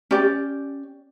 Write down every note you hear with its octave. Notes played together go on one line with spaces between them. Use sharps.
C#4 G4 D5